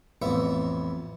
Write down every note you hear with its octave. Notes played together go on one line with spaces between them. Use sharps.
A1 F2 B3 E5